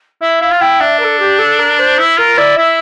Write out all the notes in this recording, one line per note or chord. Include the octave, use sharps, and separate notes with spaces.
E4 E5
E4 F5
F4
E4 G5
D4 E5
A#4
A4
G4
A4
A#4
C5
E4
F4 A#4
E4 D5
E4 E5